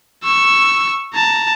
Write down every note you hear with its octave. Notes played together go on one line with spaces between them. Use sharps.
C#6 E6
A5 A#5